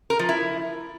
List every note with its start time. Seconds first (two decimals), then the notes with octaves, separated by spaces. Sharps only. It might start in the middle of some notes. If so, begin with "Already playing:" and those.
0.10 A#4
0.19 F3
0.29 E4